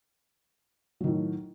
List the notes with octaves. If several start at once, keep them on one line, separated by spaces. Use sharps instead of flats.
A2 D#3 F#3